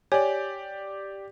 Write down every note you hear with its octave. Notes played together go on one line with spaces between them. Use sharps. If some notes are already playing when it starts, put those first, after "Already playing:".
G4 C#5 D5 G#5